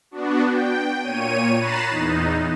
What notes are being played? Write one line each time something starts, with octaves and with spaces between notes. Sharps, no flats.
B3 D4 F#4
G5
A#2 C#5 D#7
A#5 B5 F#6 A6 C7 E7
E2 D#4